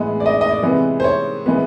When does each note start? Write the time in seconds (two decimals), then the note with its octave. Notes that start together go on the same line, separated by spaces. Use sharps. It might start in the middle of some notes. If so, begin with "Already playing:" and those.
Already playing: A2 E3 G#3 B3
0.20 D5
0.26 D#5
0.30 D5
0.41 D#5
0.51 D5
0.63 C3 E3 G#3 B3
1.00 C5
1.04 C#5
1.46 E3 G#3 B3